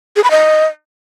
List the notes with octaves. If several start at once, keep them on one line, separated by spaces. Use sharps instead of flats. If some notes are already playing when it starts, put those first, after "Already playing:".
G#4
B5
D#5